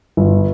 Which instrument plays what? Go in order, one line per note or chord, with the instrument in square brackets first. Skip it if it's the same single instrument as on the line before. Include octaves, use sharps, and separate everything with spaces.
[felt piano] G1